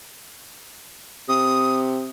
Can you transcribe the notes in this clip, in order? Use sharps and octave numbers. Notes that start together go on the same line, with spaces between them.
C3 D#6